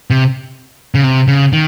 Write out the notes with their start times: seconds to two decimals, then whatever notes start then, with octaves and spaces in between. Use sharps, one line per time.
0.10 C3
0.95 C#3
1.04 C3
1.28 C#3
1.53 D#3